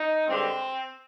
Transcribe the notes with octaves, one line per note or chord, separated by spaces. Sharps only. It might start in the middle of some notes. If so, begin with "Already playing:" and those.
Already playing: D#4
G2 D3 G#3 C4